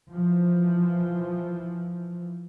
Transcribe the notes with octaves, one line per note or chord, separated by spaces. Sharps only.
E3 F3